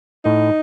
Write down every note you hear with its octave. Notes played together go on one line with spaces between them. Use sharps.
A2 D#4